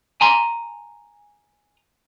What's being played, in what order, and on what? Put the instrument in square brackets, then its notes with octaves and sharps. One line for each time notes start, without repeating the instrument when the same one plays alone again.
[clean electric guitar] G#5 A#5 C6